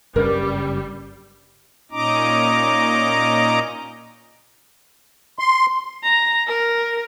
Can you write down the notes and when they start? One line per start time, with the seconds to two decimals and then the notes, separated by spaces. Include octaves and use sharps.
0.16 F#1 G2 C#3 G3 A#4 B4
1.91 A#2 C#4 D#4 D#5 A#5 D6
5.39 C6
6.03 A#5
6.47 A#4